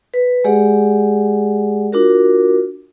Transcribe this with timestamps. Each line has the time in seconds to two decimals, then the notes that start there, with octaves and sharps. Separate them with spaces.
0.14 B4
0.44 G#3 G4 G#4 D5 F#5
1.92 D4 F4 F#4 A#4